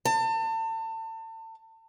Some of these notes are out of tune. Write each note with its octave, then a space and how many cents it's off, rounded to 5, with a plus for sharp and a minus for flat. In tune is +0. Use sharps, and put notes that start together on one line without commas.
A5 +35